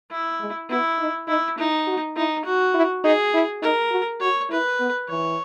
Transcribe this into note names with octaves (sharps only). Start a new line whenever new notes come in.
E4
G#3
B3 E4
D#4
D#4 E4
D#4 E4
F#4
D#4 E4
F#4
E4
D#4 G#4
E4
D#4 A#4
F#4
F#4 C#5
E4 B4
B3
E3 C#5